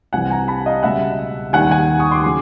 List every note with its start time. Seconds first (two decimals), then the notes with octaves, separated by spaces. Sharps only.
0.13 C2 C3 E3 G3 F#5 G#5
0.30 G#5 A#5
0.48 A5 B5
0.66 D#5 F5
0.83 C#2 B2 G3 E5 F#5
1.53 D#2 D#3 G3 F#5 G#5
1.71 F#5 G#5
2.00 C#6 D#6
2.11 C6 D6
2.24 C#3 F#3 C6 D6